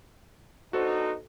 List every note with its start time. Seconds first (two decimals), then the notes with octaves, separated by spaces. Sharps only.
0.73 B3 D4 D#4 F#4 A4 C5